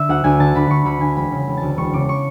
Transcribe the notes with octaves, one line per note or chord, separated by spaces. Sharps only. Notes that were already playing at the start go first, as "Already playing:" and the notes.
Already playing: D3 E5
D2 F#5
D2 G#5
D3 A5
D3 B5
D2 C#6
D2 B5
D3 G#5
E1 B5
C#3
E1
A5
D2
E1 C#6
C#3 D6
C#6